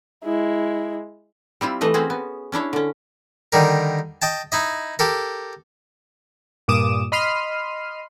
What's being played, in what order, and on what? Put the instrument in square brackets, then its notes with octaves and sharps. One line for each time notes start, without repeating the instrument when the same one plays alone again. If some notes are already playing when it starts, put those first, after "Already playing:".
[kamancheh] G#3 E4
[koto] G3 C4 E4 F4
E3 A3 B4 D#5
C4 C#4 F#4 G#4
B3
C#4 D4 E4 C#5
D3 C#4
[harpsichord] D3 D#3 G3 A#4
D#5 G5 A5
D#4 E4 D#5
G4 A4 A#4
[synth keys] G2 A#2 D6 D#6 E7
D#5 B5 C6 F6 C7 D#7